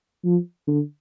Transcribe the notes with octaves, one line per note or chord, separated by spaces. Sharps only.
F3
D3